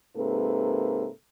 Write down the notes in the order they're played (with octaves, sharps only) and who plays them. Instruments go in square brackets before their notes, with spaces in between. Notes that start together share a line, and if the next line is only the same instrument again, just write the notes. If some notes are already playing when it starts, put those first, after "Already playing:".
[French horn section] G#2 C3 A#3 A4 B4